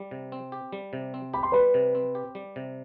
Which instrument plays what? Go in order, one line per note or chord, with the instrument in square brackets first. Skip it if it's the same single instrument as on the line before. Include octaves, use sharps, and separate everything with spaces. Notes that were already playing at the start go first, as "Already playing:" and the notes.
Already playing: [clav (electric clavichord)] G3
C3
C4
G4
G3
C3
C4
[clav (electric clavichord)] G4 [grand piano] B5
[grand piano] C6
[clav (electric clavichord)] G3 [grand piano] B4 B5
[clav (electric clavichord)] C3
C4
G4
G3
C3